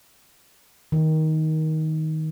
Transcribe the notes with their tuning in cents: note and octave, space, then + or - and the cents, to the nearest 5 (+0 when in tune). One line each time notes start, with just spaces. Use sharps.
D#3 +15